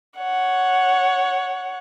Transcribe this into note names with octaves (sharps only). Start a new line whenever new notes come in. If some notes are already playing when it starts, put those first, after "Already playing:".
C#5 F#5